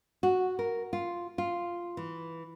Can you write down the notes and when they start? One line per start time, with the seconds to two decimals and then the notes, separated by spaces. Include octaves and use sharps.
0.23 F#4
0.59 A#4
0.93 F4
1.38 F4
1.97 E3